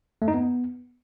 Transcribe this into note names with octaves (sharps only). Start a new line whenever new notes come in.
A3
D#4
B3